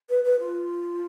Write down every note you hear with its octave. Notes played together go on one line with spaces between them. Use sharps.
B4
B4
F4